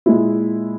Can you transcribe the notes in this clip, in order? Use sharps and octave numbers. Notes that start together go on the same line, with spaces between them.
A#2 G#3 E4